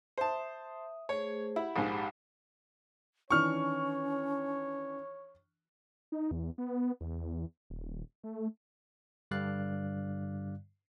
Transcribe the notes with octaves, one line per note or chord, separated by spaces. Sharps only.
C5 E5 A5 D#6
A3 G#4 C5 C#5
E4 G4 F#5 B5
A#1 G#2
D#3 E3 C#4 D4 C#5 C#6 F6
D#4
E2
B3
E2
D#1
A3
G2 D3 G3 D5 F5 F#6